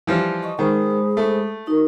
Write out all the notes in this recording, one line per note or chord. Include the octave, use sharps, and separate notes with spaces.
E3 F3 G3
D#5 C#6
D#3 G#3 G#4 C5 B5
A3
D#4 F#4 A#4